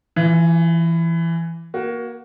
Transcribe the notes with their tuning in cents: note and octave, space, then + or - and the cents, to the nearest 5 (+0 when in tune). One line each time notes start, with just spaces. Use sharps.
E3 +15 F4 +0 F5 -45
A#3 +20 F#4 +15